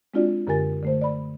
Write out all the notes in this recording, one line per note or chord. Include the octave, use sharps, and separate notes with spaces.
G#3 C4 D4 F4 F#4 D5
F#2 D3 G4 A#4 G#5 A6
D3 A3 C5
D5 B5